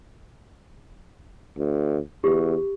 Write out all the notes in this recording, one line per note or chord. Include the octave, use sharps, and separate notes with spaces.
D2
E2 G4